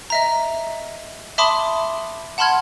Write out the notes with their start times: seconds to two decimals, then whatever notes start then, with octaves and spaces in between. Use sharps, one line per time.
0.10 D#5 E5 A#5
1.38 E5 A5 B5 C6 D6 D#6
2.38 F#5 A5 B5 C6 F6 G#6